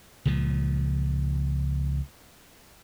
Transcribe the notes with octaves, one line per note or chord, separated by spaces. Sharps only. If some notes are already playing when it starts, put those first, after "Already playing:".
C#2 A#2 F3